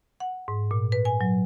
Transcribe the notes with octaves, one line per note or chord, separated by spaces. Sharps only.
F#5
G#2
A#2
B4
G#5
F#3